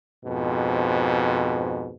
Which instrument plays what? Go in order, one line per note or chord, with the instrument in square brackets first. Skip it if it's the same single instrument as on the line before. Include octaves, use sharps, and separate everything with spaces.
[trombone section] F2 G#2 B2